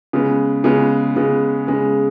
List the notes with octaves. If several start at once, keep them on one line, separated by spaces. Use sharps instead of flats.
C#3 G#3 B3
C#3 G#3 B3
C#3 G#3 B3
C#3 G#3 B3